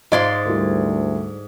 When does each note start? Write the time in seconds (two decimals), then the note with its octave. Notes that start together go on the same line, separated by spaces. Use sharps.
0.12 G#2 D5 D#5 F5 C6 G#6
0.45 D2 G3 E4 A#4